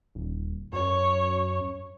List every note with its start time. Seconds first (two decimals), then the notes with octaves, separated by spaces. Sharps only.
0.15 D#1
0.73 F#2 C#5